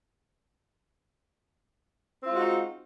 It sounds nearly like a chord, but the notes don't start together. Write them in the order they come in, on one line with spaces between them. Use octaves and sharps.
C4 F4 G#3 F#4 D#4